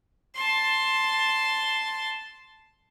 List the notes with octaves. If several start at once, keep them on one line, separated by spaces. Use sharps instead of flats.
A5 C6